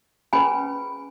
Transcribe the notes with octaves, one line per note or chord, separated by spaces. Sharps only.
C#4 G#4 B4 G#5 B5